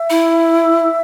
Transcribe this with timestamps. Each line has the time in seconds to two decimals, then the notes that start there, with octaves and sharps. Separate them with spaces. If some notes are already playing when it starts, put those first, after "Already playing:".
Already playing: E5
0.10 E4